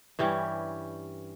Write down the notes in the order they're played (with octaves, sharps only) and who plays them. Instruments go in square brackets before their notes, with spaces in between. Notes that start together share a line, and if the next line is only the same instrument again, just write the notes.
[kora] G2 E3 G3 C#4 G4